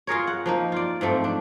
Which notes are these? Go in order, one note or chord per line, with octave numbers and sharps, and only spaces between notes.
F4 G#4 A#4 C#5
F#5
F3 A#3 D#4
F4 D5
G#2 F3 A3 C4
D4